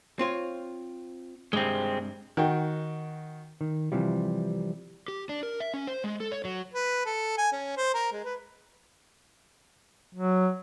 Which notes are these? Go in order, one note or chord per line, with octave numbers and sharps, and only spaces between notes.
C4 F4 C#5
G2 C3 G#3 C4
D#3 F#4 G5
D#3
C3 E3 F3 G3
G4
D4
A#4
E5
C#4
C5
G#3
A4
C#5
F#3
B4
A4
G#5
C#4
C5
A#4
G#3
B4
F#3